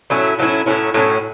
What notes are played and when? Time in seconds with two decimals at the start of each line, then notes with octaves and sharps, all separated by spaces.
0.10 A2 F#3 C#4 E4
0.39 A2 F#3 C#4 E4
0.66 A2 F#3 C#4 E4
0.94 A2 F#3 C#4 E4